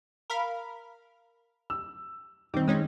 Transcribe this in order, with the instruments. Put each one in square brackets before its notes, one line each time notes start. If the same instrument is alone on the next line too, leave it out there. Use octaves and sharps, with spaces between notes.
[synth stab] A#4 F5 B5
[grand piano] E6
[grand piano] D#3 [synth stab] G3 C4
[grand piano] D#3 [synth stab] G#3 C#4 D#4